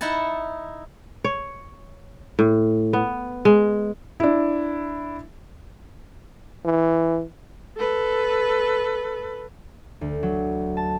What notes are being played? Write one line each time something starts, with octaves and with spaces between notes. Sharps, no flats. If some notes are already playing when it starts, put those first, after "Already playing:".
D#4 E4 F#5 A5
C#5
A2
B3
G#3
D4 E4
E3
A4 B4
D2
F#3
A5